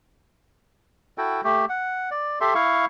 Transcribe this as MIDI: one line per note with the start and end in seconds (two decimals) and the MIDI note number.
1.18 1.41 64
1.18 1.41 66
1.18 1.41 69
1.18 1.41 79
1.44 1.65 57
1.44 1.65 67
1.69 2.10 78
2.11 2.39 74
2.41 2.54 67
2.41 2.54 69
2.41 2.54 76
2.41 2.54 84
2.55 2.85 64
2.55 2.85 77
2.55 2.85 85